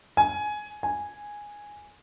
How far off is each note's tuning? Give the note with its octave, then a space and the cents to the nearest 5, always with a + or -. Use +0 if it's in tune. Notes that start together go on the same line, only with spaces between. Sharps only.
G#5 +15
G#5 -5